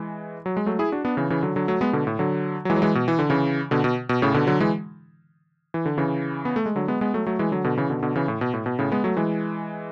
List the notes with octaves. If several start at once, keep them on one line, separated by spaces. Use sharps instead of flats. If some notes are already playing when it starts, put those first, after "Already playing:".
Already playing: E3 G#3
F#3
G#3
F#3 A3
E4 G#4
D4 F#4
B3 D4
C#3 E3
C#3 E3
D3 F#3
D3 F#3
F#3 A3
G#3 B3
B2 D3
A2
D3 F#3
F#3
E3 G#3
F#3
E3 G#3
B2
E3
D3
C#3 E3
B2 D3
B2
B2
A2 C#3
B2 D3
D3 F#3
E3 G#3
E3
D3
C#3 E3
B3
A3
G#3
D3 F#3
G#3 B3
G#3 B3
F#3 A3
F#3 A3
E3 G#3
D3 F#3
B2 D3
C#3 E3
B2 D3
B2 D3
C#3 E3
A2
B2
A2
B2
A2 C#3
G#3 B3
F#3 A3
E3 G#3